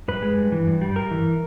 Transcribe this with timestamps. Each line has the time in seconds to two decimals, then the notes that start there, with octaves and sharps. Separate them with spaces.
0.08 G2 B4
0.22 G#3
0.38 G2
0.52 E3
0.67 G2
0.81 G3
0.96 G2 A#4
1.11 E3